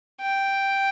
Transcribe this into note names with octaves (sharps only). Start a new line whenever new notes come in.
G5